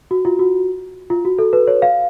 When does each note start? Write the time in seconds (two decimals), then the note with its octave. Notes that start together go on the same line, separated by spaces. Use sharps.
0.11 F#4
0.25 F4
0.39 F#4
1.10 F4
1.25 F#4
1.39 A4
1.53 B4
1.67 C#5
1.82 F5